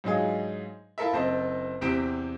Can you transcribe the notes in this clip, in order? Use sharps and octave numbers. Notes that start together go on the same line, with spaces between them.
G#2 F#3 D4 D#4 F4 G#4
E4 F4 A4 A#4 E5
F#1 C4 A4 D#5
E2 C3 C4 G4 D7